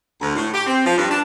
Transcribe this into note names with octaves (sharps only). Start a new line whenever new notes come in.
D2
A2
G4
C4
F3
G2
D4